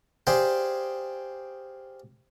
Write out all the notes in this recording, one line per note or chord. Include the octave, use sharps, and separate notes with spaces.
G4 G#4 C5 D5 F5 G5